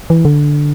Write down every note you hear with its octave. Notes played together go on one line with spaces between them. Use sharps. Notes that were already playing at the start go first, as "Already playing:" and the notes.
E3
D3